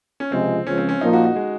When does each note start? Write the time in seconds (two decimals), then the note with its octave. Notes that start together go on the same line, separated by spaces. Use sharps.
0.20 C#4
0.31 C#2 C3 F3 G#3 C4
0.67 C#2 C#3 F3 C#4
0.78 C4
0.89 C#4
1.01 A#2 F3 A#3 D#4
1.13 F#4
1.25 F#4
1.36 G#3